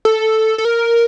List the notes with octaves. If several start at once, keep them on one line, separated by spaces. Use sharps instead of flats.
A4
A4
A#4